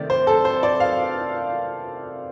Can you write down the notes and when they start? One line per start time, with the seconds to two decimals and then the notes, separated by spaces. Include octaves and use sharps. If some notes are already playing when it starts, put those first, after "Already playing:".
Already playing: C3 D#3 A3 D5
0.10 C5
0.27 A4
0.45 C5
0.63 D5
0.80 F5